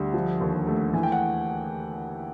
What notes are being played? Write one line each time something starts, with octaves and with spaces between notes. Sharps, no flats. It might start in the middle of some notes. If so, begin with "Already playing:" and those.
Already playing: D2 G3
F3
D#2
A3
E3 G#5
G5
F#5